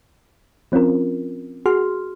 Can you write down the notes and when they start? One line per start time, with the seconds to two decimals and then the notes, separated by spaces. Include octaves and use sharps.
0.72 F3 C4 C#4 F4 A#4
1.66 F#4 G#4 C6 F6